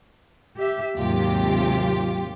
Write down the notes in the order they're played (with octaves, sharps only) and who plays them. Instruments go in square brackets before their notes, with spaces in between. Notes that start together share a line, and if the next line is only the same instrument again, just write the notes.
[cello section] G4 E5
[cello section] D#2 G#2 C3 [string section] F#3 F4 G4